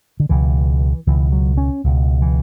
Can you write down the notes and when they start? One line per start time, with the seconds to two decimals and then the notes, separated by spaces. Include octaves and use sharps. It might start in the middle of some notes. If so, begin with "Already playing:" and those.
0.20 D3
0.29 C#2 B2 E3
1.07 C#2 B2 E3
1.32 F#3
1.57 C#4
1.84 C#2 B2
2.22 E3